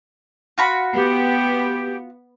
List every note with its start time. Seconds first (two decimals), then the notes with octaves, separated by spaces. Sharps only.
0.58 F4 F#4 B5
0.94 B3 G4